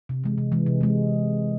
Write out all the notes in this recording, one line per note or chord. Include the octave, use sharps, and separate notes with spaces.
C3
E3 G#3
C3
E3 G#3
C3
E3 G#3